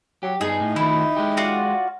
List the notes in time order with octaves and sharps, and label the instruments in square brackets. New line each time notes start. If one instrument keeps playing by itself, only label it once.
[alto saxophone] F#3 [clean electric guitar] G4
[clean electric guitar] G2 B3 [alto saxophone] D#4 [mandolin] G#4
[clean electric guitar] A2
[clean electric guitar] D#3 F3 A3 [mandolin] E4
[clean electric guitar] G#3 G4
[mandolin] F4 F#4 D5